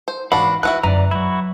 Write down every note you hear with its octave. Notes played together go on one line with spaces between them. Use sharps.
C5
G#2 E3 D4 F#4 B4 F5 B5
D#4 E4 F#4 B4 F#6
F#2 D3 E3 D5 A#5
F#3 E4 F#4